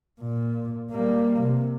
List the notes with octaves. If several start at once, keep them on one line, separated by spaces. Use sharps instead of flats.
A#2
G3 A#3
C3